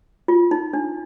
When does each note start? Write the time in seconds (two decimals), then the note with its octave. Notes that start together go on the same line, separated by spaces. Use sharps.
0.28 F4
0.51 D#4
0.73 D4